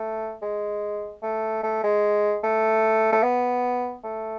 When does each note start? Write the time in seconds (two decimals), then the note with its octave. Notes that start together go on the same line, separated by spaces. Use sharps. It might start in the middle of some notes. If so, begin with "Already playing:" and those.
Already playing: A3
0.42 G#3
1.23 A3
1.63 A3
1.83 G#3
2.43 A3
3.12 A3
3.23 B3
4.04 A3